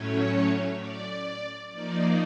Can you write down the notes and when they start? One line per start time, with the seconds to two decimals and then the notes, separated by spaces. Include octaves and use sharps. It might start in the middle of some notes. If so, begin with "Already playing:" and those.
Already playing: A2 F#3 A3 C#4 C#5
0.75 D5
1.70 F3 A#3 D#4 D5